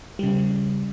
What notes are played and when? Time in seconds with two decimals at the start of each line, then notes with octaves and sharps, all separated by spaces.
0.19 C#3 G3